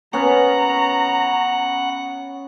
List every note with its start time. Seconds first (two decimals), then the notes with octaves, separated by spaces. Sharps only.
0.13 B3 C#4 F#5 A#5